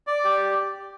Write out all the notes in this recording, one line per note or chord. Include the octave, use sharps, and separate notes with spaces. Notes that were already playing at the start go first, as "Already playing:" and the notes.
D5
G4